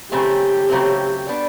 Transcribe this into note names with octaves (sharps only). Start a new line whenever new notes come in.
C#3 F#3 A3 C4 G4
C#3 F#3 A3 C4
G3 B3 D4